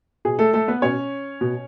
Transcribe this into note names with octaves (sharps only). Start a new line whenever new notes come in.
B2 G#4
A3 A4
A3 A4
B3 B4
B2 C#4 C#5
B2